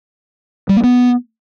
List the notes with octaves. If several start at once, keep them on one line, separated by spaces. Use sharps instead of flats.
G3
A#3
B3